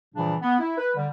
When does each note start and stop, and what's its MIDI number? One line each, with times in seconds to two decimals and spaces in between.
0.15 0.34 46
0.15 0.34 49
0.15 0.34 52
0.15 0.34 53
0.15 0.34 55
0.15 0.34 62
0.41 0.58 59
0.59 0.74 64
0.78 0.91 71
0.96 1.08 50
0.96 1.08 55